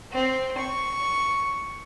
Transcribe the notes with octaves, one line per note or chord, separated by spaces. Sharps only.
C4
C#6